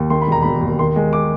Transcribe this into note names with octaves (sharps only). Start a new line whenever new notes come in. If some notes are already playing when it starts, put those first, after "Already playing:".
Already playing: D#2
D#3 C6
B5
E1 A#5
E1 B5
D#2
D#3 C6
G#3
D6